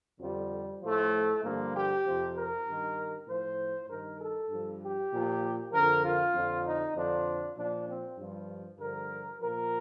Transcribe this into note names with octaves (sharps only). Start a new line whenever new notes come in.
F2 D3 F3 G3
A2 F3 A3
G2 D3 F3 A#3
G4
F2 C3 F3
A#4
G2 D#3
A2 F3 C5
G2 D#3 A#4
A4
G2 F3
G4
A#2 F3
F2 D3 F3 A#4
F4
F2 D3 F3
D#4
F2 D3 F3 D4
A#2 F3 D4
C4
G2 F3
G2 D3 F3 A#4
A#2 F3 A#4